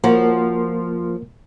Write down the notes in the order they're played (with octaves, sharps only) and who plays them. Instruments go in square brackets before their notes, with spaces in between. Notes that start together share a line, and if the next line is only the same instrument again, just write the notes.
[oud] F3 F#4 [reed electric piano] A#3 A#4